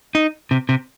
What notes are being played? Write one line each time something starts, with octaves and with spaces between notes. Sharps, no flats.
D#4
C3
C3